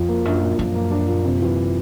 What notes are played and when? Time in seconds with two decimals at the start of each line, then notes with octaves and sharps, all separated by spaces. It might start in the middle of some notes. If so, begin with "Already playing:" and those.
Already playing: F2 F3
0.08 A#3
0.25 F#2 D4
0.41 A#2
0.58 F#2 F3
0.74 A#3
0.91 D4
1.08 A#2
1.24 C3
1.42 E3